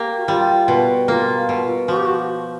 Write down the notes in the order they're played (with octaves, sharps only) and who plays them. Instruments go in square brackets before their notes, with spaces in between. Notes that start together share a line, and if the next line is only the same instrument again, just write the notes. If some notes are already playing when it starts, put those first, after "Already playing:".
Already playing: [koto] A#3 G4
[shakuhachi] F#4
[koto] G3 [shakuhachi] F4
[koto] B2
[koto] A#3 [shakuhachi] F4
[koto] B2
[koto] F3 [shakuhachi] F#4
[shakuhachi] G4
F#4